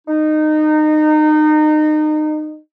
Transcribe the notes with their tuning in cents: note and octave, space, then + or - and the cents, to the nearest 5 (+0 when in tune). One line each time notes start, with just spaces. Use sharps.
D#4 -25